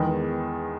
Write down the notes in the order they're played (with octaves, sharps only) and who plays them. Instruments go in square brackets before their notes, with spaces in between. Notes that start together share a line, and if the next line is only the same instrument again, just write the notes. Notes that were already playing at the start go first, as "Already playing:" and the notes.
Already playing: [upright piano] E2 D#3 G#3 B3